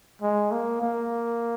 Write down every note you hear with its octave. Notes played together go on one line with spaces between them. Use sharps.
G#3
A#3
A#3